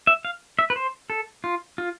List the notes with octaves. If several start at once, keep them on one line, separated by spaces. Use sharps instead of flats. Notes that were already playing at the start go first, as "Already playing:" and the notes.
E5
F5
E5
B4
C5
A4
F4
F4